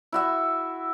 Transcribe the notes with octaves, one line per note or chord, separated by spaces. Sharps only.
E4 F#4 E5